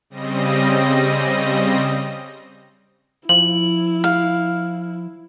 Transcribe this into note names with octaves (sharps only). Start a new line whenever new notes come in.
C#3 G3 C4 D#5 A#6
F3 E4 F#7
F5